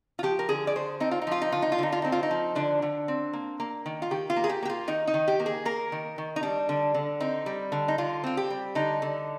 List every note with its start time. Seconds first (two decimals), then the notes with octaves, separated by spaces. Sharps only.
0.19 F4
0.23 F3 G4
0.39 A#4
0.49 D3 G#4
0.67 D5
0.75 D3 C5
1.00 C4 D#4
1.11 F4
1.22 D#4
1.27 F3 F4
1.42 D#4
1.52 D3 F4
1.62 D#4
1.72 F4
1.78 D3 D#4
1.92 F4
2.02 C4 D#4
2.12 F4
2.23 D#4
2.31 F3
2.55 D3 D4
2.82 D3
3.08 C4
3.33 A#3
3.60 A#3
3.86 D#3
4.02 F4
4.11 D#3 G4
4.30 F4
4.36 A#3
4.44 G#4
4.49 G4
4.62 A#3 G4
4.70 F4
4.88 D#3 D#4
5.07 D#4
5.14 D#3
5.28 G4
5.40 A#3
5.46 G#4
5.65 A#3 A#4
5.92 D#3
6.18 D#3
6.36 D#4
6.43 G3 D4
6.69 D3
6.94 D3
7.20 C4 D#4
7.46 G3
7.72 D3
7.88 D#4
7.98 D3 F4
8.24 C4 F4
8.37 G4
8.50 G3
8.75 D3 D#4
9.02 D3